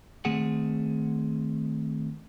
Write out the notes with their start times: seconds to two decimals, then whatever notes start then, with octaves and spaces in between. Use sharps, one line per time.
0.25 D#3 A3 C4 G#4 F#5